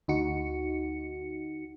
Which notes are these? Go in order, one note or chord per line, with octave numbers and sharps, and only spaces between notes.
D2 D#4 F#4 C#7